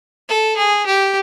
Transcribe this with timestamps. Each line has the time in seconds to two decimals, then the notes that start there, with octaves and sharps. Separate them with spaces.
0.29 A4
0.57 G#4
0.86 G4